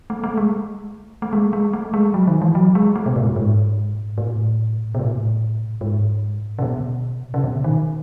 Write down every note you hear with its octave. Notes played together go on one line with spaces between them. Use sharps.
A3
A3
G#3
A3
G#3
G#3
A3
G#3
F#3
D#3
E3
F#3
G#3
A3
B2
A2
G#2
G#2
A2
B2
A2
G#2
C#3
B2
C#3
B2
D#3